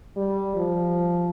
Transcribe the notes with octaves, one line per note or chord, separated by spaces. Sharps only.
G3
F3